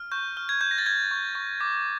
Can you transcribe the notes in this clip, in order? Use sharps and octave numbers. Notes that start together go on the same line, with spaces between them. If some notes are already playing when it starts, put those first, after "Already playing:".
Already playing: F6
C#6 G6
F6
G#6
C#6 G6
A#6
A6
F6 G#6
C#6
C#6
D6 A#6